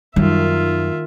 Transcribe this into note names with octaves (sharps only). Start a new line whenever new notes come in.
F#2 D#3 G3 F4 E5